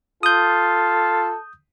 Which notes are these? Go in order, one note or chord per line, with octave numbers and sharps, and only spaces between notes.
F4 A4 D#6 G6